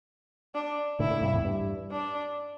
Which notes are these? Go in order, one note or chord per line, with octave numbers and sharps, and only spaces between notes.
D4
A2 D3 E4
A2 D3
G2 C3
E2 A2
G2
D4